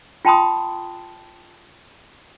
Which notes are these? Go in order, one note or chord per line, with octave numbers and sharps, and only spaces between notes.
F4 G5 A5 B5 C6 D#6